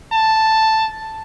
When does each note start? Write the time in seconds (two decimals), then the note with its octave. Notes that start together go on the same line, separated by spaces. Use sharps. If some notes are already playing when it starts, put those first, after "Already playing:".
0.12 A5